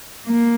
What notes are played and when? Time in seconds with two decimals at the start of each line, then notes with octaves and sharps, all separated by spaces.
0.26 A#3